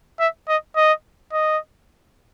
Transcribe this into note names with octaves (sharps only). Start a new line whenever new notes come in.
E5
D#5
D#5
D#5